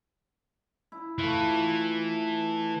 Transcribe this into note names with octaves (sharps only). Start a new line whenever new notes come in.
E4
E3 A3 F4